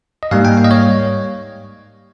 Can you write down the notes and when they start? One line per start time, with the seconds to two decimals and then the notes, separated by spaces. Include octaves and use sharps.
0.23 D#5
0.31 G#2 G3 A#3 F5
0.45 G5
0.57 F5
0.64 D#5
0.71 C#5